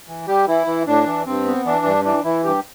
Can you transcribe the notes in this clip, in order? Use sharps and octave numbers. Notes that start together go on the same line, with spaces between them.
E3
G3 G4
E3 E4
E3
A2 D4
E3
G2 C4
B3
E3 D4
G2
E3 D4
E3 E4
G2 G4